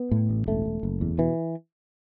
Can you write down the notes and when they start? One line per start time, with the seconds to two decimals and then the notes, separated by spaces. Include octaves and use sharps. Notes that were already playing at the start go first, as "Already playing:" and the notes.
Already playing: B3
0.11 A2
0.29 A1
0.47 E1 A3
0.65 E1
0.83 F#1
1.01 E2
1.18 B2 E3